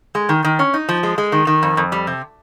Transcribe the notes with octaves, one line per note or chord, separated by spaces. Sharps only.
G#3
D#3
D#3
C#4
D#4
F3
G#3
G#3
D#3
D#3
F2
F2
G3
C3